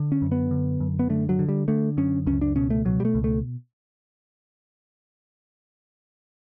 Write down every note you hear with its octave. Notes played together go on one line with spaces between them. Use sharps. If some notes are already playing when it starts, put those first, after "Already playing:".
Already playing: D3
C#4
F#2
B3
D3
F#2
B3
D3 A3
F#3
D3
G3
D3 A3
F#2 C#4
C#2 C#4
D4
B2 C#4
A3
B2 F#3
G3
A3
C#2
A3